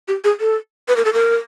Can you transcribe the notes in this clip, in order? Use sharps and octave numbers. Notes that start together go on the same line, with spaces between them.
G4
G#4
A4
B4
A#4
A4
A#4